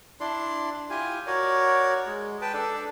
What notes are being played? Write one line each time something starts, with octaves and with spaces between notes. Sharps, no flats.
D4 E4 D5 C6
E4 F4 G4 G#5
F#4 A#4 C#5 D5
G#3
B4 G5 A5
D4 A4 D5